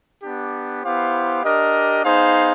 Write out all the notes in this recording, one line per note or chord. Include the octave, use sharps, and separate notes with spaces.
B3 D4 G4
B3 E4 G4 C5 F5
D4 G4 A#4 D#5
B3 D#4 G#4 C5 F5